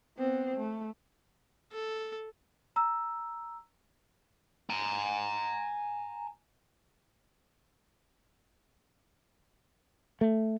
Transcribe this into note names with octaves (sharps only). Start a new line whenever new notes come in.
B3 C4
A3
A4
A#5 E6
G#5 A#5
A3